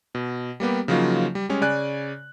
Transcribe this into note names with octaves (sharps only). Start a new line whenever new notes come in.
B2
G3 A#3 B3 G4
C#3 F3 F#3 A#3 D#4 F4
G3
G3 G#3 C#4
C#3 D5 G#5 F#6